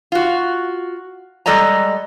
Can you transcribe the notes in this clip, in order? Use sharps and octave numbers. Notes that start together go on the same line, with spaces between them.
F4 F#4
G3 G#3 A4 D5 D#5 A#5